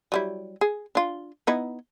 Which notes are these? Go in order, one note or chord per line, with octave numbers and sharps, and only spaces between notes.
F#3 G3 E4
G#4
D4 F4
B3 D#4 E4